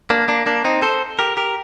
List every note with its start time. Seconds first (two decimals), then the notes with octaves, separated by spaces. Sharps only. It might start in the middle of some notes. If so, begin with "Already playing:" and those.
0.10 A#3 D4
0.28 A#3 D4
0.46 A#3 D4
0.64 C4 D#4
0.82 A4 C5
1.19 G4 A#4
1.37 G4 A#4